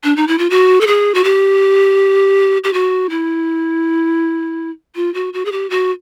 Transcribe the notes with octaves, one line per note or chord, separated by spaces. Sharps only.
D4
D#4
E4
F4
F#4
A4
G#4
F#4
G4
G4
F#4
E4
F4
F#4
F#4
G#4
G4
F#4